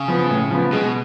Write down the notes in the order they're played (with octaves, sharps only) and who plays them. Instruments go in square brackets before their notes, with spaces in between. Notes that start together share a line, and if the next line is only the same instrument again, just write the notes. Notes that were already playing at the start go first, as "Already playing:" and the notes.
Already playing: [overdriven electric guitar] C#3
[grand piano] F3 B3
A2
F3 B3
[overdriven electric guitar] B2 [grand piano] G#3